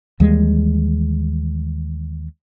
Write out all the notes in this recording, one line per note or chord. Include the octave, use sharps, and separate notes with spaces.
D#2 E3 G3 G#3